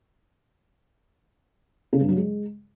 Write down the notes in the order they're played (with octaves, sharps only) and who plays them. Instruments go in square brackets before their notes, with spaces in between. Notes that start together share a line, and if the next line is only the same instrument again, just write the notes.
[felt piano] C#3
G2
F#3
G#3